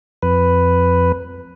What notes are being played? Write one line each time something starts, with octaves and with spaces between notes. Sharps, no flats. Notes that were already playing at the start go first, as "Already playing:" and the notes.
F2 B4